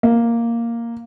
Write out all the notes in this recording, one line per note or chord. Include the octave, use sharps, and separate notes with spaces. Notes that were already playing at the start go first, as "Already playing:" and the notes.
A#3